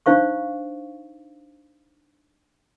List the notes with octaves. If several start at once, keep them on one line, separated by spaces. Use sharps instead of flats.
D4 D#4 C5 F5 C#6